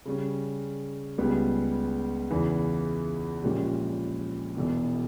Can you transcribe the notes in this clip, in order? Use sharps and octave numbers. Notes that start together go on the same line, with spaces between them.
C#3 G3 C#4
C#2 C#3 G3 B3
E2 C#3 E3
A#1 A#2 G#3 C#4 G4
E1 E2 B2